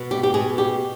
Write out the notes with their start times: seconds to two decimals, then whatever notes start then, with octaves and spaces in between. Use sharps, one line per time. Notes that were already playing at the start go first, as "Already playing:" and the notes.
Already playing: B2
0.11 G4
0.23 G4
0.34 B2 G#4
0.58 G4